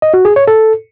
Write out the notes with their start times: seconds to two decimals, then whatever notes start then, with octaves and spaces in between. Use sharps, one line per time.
0.02 D#5
0.14 F#4
0.25 G#4
0.36 C#5
0.48 A4